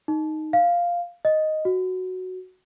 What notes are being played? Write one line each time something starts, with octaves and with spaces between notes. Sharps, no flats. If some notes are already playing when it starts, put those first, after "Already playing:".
D#4
F5
D#5
F#4